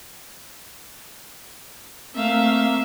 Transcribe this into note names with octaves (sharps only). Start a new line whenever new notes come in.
A3 A#3 C4 E5 F5